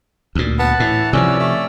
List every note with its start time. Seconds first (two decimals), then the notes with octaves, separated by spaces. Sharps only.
0.35 D2 A#2
0.59 B3 F#5 A5
0.80 A2 E3
1.13 C3 D#3 F3 C#4 D5 E6
1.39 A3